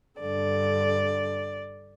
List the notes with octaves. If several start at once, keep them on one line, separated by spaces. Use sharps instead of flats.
G2 D3 D5